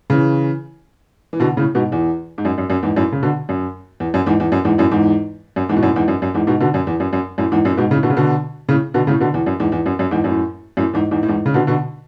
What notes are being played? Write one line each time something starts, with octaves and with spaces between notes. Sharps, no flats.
C#3 E3
E3
B2 D3
A2 C#3
G#2 B2
E2
G#2
F#2
F#2
F#2
E2 G#2
F#2 A2
C#3
B2 D3
F#2
E2
F#2
E2 G#2
E2
F#2
E2 G#2
F#2 A2
E2 G#2
F#2
E2 G#2
B2
F#2 A2
E2 G#2
F#2
F#2
E2 G#2
G#2 B2
B2 D3
F#2
E2
F#2
F#2
F#2 A2
E2 G#2
F#2 A2
G#2 B2
A2 C#3
B2 D3
C#3
B2 D3
A2 C#3
B2 D3
A2 C#3
B2 D3
E2
F#2
E2 G#2
E2
F#2
F#2
E2 G#2
F#2 A2
F#2 A2
E2 G#2
E2 G#2
A2
E2 G#2
C#3
B2 D3
B2 D3